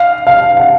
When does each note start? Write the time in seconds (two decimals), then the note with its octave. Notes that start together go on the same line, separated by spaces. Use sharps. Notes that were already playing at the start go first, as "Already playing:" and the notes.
Already playing: F5
0.27 F5
0.57 F#5